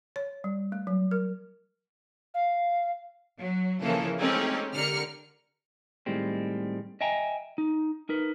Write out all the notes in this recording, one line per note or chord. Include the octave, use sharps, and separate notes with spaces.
C#5
G3
A3
F#3
A#4
F5
F#3
C#3 E3 F3 A#3 C#4 A4
G#3 A3 C4 C#4 D#4 G4
D3 G4 A#4 D5 F6 C#7
A2 D#3 G3 G#3 C4
D#5 E5 G5 G#5 A#5
D#4
D#4 A#4 B4